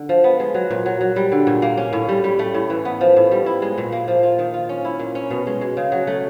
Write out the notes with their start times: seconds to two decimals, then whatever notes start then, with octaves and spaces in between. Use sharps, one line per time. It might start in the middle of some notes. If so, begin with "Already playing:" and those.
Already playing: D3
0.09 F3
0.24 B3
0.40 G#3
0.54 F#3
0.70 A#2
0.86 F#3
1.01 F#3
1.16 G3
1.32 D3
1.47 A#2
1.62 A#3
1.77 C#4
1.93 A2
2.09 G3
2.24 G3
2.39 A3
2.54 A2
2.70 E3
2.85 B3
3.01 F3
3.17 A2
3.31 G3
3.46 E4
3.62 G#3
3.78 A#2
3.92 A#3
4.08 F3
4.23 F4
4.39 D#3
4.54 F4
4.69 C#4
4.85 E4
4.99 A#2
5.15 C#4
5.31 B2
5.47 G#3
5.61 G#3
5.77 C#3
5.92 F#3
6.07 A3